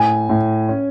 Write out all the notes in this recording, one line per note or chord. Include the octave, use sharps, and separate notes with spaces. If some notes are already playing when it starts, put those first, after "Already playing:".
Already playing: A2 G#5
A2
C#4